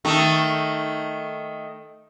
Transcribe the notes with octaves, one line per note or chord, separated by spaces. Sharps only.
D#3 A3